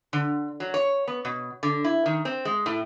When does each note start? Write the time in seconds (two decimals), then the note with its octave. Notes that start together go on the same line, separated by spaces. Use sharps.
0.13 D3
0.60 F#3
0.74 C#5
1.08 B3
1.25 B2
1.63 D3
1.85 E4
2.06 D#3
2.25 C4
2.45 G#3
2.66 A2